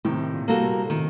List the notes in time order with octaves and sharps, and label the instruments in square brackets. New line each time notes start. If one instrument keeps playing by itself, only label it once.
[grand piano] A2 C3 [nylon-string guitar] D#3
[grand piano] A#2
[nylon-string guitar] G3 A#3 F#4 A4
[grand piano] A#2
[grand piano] A2 C3 [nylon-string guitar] D#3